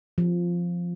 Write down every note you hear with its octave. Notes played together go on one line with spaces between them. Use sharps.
F3